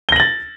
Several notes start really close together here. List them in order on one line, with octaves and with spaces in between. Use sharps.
G7 A#6 F#7 A6